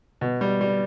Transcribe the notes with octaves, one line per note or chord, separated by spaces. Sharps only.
B2
G3
G3